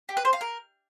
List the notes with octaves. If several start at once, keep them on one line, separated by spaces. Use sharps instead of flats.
G4
B4
C5
F5
A#4